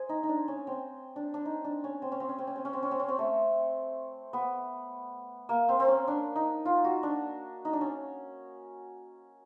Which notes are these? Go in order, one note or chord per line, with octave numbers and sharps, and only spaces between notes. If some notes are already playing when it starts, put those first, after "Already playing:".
Already playing: G#4 C5
D#4
D#4
D4
C#4
C4
D4
D4
D#4
D4
C#4
C4
C#4
C4
C#4
C4
C#4
C4
C#4
C4
C#4
C4
C#4
C4
A3
B3
A#3
C4
C4
C#4
D4
D#4
F4
F#4
D4
D#4
D4
C#4